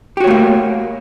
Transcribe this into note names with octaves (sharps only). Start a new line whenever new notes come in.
A3 A#3 F#4 G4 C#5